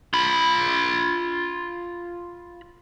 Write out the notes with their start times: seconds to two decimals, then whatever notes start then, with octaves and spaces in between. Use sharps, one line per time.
0.14 F4 B5